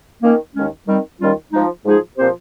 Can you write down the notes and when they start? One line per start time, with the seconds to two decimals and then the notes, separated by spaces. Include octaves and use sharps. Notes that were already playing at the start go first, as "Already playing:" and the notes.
0.22 D#3 A#3 C#4
0.55 D#2 D#3 G#3 C#4
0.87 D#3 G3 C4
1.20 D#2 D#3 G3 C#4 F4
1.52 F3 G#3 D#4
1.85 G#2 F3 G#3 D#4 G#4
2.17 A#2 F3 C4 G4 C5